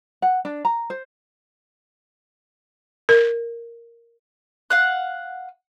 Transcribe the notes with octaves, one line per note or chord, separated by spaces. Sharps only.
F#5
D4
A#5
C5
A#4
F5 F#5 F#6